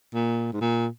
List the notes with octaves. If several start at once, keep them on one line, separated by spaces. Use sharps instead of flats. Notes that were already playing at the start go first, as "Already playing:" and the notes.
A#2
G#2
A#2